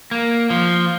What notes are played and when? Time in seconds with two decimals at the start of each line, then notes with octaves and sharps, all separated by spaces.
0.11 A#3
0.50 F3